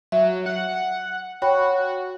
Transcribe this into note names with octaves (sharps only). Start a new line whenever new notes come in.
F#3 E5
F#5
F#4 C#5 G5 B5